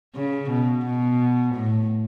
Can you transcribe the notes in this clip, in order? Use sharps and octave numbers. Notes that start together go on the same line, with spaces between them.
C#3
B2
B2
A2